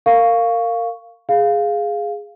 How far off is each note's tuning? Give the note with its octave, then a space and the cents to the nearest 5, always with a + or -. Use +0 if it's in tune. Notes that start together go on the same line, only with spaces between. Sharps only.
A#4 -25 F5 +0 C#6 +10
G#4 +0 F5 +0